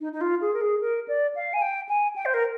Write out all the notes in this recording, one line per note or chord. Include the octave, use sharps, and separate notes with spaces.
D#4
D#4
F4
G#4
A#4
G#4
A#4
D5
F5
G#5
G5
G#5
G5
C5
A#4